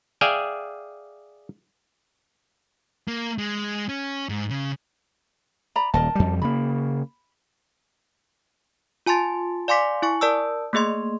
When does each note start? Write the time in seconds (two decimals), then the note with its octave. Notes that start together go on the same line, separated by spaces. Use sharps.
0.21 G#4 D5 E5 F5 G5 G#5
3.08 A#3
3.38 G#3
3.89 C#4
4.29 G#2
4.50 C#3
5.76 D5 A#5 B5
5.94 D#1 A#4 D#5 A5
6.15 F2 G3
6.42 C#3 A#3 B5
9.06 F4 G#5 A5 C6 A6
9.68 D5 F5 G#5 C6 D6 B6
10.02 E4 G#5 C#6
10.21 A#4 D5 A5 E6
10.73 A3 A#3 G#4 D#5 C6